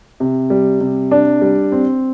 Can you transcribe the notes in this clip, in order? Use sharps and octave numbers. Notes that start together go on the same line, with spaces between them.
C3
G3
C3
D4
G3
C4